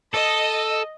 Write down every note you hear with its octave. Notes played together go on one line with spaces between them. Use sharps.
A4 D#5